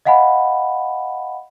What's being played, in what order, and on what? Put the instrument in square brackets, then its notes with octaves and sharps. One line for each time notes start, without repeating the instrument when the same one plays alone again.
[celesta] D#5 F5 F#5 G#5 B5